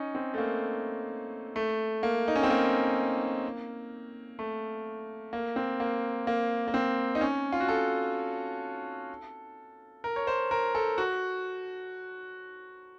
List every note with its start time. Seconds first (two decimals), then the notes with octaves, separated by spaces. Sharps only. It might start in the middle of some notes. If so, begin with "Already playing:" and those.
Already playing: C#4 D#4
0.15 C4
0.34 A3
0.38 A#3
1.56 A3
2.03 A#3
2.28 D#4
2.35 C#4
2.43 C4
2.50 A#3
4.39 A3
5.33 A#3
5.56 C4
5.80 A#3
6.27 A#3
6.68 A#3
6.74 C4
7.15 D#4
7.21 C#4
7.53 F4
7.60 F#4
7.68 A4
10.04 A#4
10.16 C#5
10.27 C5
10.51 A#4
10.75 A4
10.98 F#4